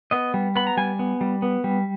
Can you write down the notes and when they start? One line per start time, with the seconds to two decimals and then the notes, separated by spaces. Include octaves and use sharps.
0.11 B3 D#5
0.34 G3
0.56 B3 B5
0.67 A#5
0.77 G3 G#5
0.99 B3
1.21 G3
1.42 B3
1.64 G3